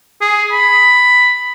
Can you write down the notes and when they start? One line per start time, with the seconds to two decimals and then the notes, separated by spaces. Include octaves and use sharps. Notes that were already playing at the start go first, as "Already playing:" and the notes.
0.21 G#4
0.52 B5